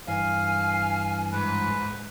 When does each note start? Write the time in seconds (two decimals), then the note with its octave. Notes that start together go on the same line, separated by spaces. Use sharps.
0.08 G2 E3 F5 G#5
1.32 G#2 B4